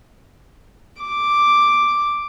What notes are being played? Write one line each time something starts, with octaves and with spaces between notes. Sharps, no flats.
D6